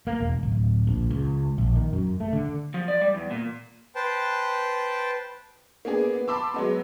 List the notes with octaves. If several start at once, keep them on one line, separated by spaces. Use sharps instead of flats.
A#3
E1
D1
A#1
C#2
A#1
D#3
F#2
A3
D3
F3
D5
G3
E2
A#2
B4 C5 G5 A5
A#3 B3 D4 G#4
B3
A5 B5 C6 D6 E6
F#3 G#3 B3